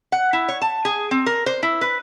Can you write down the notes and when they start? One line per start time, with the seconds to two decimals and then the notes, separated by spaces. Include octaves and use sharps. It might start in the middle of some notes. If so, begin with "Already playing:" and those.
0.12 F#5
0.33 E4
0.48 C#5
0.62 A5
0.85 G#4
1.11 C4
1.26 A#4
1.46 C5
1.63 E4
1.81 B4